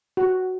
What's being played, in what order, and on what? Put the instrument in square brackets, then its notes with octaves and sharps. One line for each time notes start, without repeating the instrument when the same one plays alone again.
[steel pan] F#4